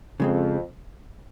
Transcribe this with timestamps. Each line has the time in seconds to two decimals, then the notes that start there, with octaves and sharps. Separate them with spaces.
0.20 F2 C#3 G#3 C4